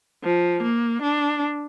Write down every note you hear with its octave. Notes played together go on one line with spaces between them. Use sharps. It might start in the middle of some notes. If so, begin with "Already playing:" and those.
F3
A#3
D4